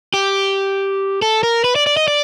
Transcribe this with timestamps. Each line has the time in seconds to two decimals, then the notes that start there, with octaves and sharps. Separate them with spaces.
0.14 G4
1.22 A4
1.43 A#4
1.64 B4
1.76 D5
1.87 D5
1.97 D#5
2.08 D5